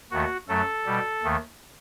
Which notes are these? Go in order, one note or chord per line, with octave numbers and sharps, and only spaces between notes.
D#2 D#3 A3 F#4
F#2 F#3 A3 A4
B2 G3
D#2 D#3 A3